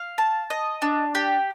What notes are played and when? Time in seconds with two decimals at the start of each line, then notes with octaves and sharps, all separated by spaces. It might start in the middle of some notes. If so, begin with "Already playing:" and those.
Already playing: F5
0.18 A5
0.50 D#5
0.82 D4
1.15 G4